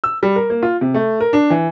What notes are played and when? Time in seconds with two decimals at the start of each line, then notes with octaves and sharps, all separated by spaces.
0.04 E6
0.23 G3
0.36 A#4
0.50 A#3
0.63 F4
0.81 C3
0.94 A3
1.20 A#4
1.33 D4
1.50 E3